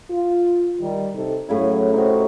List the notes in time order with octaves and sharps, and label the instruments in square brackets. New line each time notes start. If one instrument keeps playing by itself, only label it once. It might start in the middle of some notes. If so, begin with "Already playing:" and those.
[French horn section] F4
D#3 G3
C3 D#4 A4
[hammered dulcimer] A2 C#3 E4 [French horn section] F#3
[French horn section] C3 C4 [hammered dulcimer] D#4 F#4